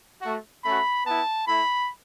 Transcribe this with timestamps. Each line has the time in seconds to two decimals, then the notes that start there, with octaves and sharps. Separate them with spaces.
0.22 A3 F#4
0.64 A3 C#4 F#4 B5
1.06 B3 E4 A5
1.47 A3 E4 B5